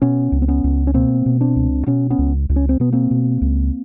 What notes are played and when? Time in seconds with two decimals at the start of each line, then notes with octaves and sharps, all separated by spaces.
0.02 B2 B3 C#4
0.32 C#2
0.42 C4
0.48 B3 C#4
0.64 C#2
0.87 C#4
0.94 B2 A#3 C4
1.26 B2
1.41 C4 D4
1.56 C#2
1.86 B2 B3 C#4
2.10 B3 C#4
2.19 C#2
2.49 C#2
2.56 C#4
2.69 C4
2.80 B2 B3
2.92 A#3 C4
3.11 B2
3.41 C#2